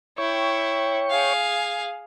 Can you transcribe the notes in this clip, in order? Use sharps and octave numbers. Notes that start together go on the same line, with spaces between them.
E4 C#5 G5 C#6
G#4 F5